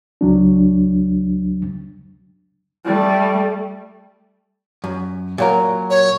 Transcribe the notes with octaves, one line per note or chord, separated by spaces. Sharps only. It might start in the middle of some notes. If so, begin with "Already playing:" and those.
C#2 F#3 D4
G3 A3
F#2
A#2 F#3 A#4
C#5